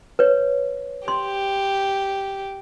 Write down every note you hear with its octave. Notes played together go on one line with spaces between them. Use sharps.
B4 C#5
G4 C6